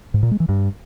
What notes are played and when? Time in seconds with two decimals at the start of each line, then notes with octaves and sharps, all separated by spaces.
0.14 G#2
0.23 A#2
0.31 G#3
0.40 E3
0.49 G2